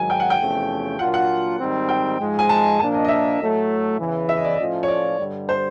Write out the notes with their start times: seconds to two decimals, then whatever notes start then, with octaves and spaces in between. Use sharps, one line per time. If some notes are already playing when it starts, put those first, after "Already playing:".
Already playing: G#2 D#3 F#3 G#5
0.10 G5
0.20 F#5
0.30 G5
0.39 E2 C3 F3 A3 C#4
0.99 A#2 F#3 A#3 D4 F4 F#5
1.14 F#5
1.59 G#2 D#3 G3 C4 D#4
1.89 G5
2.19 G#2 F3 G#3
2.39 G#5
2.49 A5
2.79 A#2 F3 A#3 D4 A5
2.94 D#5
3.05 D#5
3.08 E5
3.39 A2 F#3 A3
3.99 E2 C#3 E3
4.29 E5
4.36 D#5
4.44 D5
4.53 D#5
4.59 A2 F3 A3 C#4 F4
4.83 C#5
4.88 D5
5.18 G2 D3 G3
5.49 C5